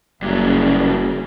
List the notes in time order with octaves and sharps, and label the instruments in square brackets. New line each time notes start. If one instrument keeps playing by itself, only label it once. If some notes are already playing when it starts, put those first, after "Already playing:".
[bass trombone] F#1 [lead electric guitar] G2 F#3 [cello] C#3 A#3